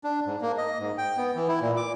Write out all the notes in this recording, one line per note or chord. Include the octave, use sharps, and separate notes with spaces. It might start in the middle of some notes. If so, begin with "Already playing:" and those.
D4
G#2
A#3
D#5
G#2
G5
B3
E3
E4
A#2
D6